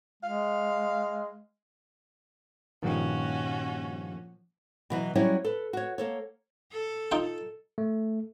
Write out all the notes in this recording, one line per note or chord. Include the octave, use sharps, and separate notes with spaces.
G#3 F5
G2 A#2 D#3 F3 A#3 C#4 F#4
B2 E3 F#3
F#3 G3 C#4 E4 F#4 C#5
A4 B4
F#4 C#5
A#3 A4 C#5
A4
D#4 F4 G5
A3